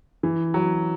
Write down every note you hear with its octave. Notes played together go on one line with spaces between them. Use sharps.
E3
F#3